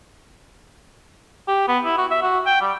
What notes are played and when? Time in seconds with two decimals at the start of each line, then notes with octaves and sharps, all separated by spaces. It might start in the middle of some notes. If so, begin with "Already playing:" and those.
1.48 G4
1.68 B3
1.85 E4
1.98 F#4
2.11 E5
2.22 F#4
2.46 G5
2.61 G3